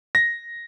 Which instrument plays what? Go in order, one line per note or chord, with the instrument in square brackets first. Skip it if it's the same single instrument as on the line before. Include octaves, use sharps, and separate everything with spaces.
[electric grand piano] A#6